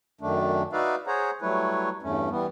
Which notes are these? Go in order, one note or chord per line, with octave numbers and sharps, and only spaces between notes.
F#2 D#3 A3 D4
D#4 F#4 B4 D5 E5 F5
G#4 C5 C#5 F#5 A#5
F#3 G3 A3 E4 B4 C#5
E2 G2 A3 C#4
E3 G3 B3